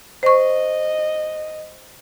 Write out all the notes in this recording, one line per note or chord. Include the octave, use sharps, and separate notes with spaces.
C5 D#5 C#6